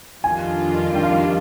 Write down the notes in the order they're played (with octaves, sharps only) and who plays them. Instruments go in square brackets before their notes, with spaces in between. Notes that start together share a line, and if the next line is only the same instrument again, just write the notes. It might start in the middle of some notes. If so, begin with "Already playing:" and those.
[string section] F2 D#3 G3 D4 F4 [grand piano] G#5
[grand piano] G5
F5